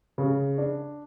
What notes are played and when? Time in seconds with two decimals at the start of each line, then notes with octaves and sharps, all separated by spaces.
0.18 C#3
0.58 D4